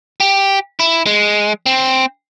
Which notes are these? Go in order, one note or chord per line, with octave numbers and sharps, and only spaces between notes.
G4
E4
G#3
C4